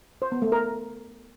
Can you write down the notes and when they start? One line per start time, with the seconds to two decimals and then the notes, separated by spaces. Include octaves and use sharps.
0.22 C5
0.32 B3
0.42 A3
0.52 A#4